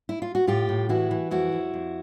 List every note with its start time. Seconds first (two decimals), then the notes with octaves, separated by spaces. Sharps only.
0.09 E4
0.22 F4
0.35 F#4
0.47 A2 F4 G4
0.69 A2
0.89 E3 E4 F#4
1.11 E3
1.31 F2 E4 F#4
1.52 F2
1.74 F2